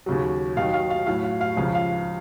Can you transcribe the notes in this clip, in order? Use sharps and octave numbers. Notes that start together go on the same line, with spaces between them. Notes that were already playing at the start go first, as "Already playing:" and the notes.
D#2 C#3 F#3
D#2 D#3 F#3 F5
F5
F5
A2 F#3 F5
F5
F5
C#2 C#3 F3 F5
F5